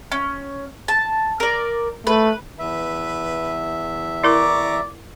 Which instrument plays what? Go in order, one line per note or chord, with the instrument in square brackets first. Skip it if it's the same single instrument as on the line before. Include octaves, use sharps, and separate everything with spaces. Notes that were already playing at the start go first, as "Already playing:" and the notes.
[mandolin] C#4
A5
A#4 D5
[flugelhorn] A3 [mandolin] B4
[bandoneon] E2 E5 [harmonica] B4
[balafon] E4 A#4 [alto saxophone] D5 [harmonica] A#5 C#6 D6